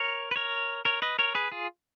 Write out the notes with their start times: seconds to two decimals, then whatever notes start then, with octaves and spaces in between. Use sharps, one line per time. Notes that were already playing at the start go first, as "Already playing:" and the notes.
Already playing: A#4 C#5
0.31 B4
0.36 A#4 C#5
0.85 A#4 C#5
1.02 B4 D#5
1.19 A#4 C#5
1.35 G#4 B4
1.52 F4 G#4